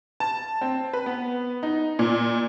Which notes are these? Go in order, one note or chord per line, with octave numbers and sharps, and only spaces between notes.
A5
C4
B4
B3
D#4
A#2